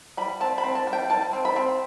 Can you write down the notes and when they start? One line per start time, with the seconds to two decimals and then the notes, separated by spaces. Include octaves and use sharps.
0.17 G3 B5
0.40 C4 A5
0.58 B5
0.64 C4
0.75 A5
0.87 G3
0.93 G5
1.10 G3 A5
1.33 C4
1.45 B5
1.56 C4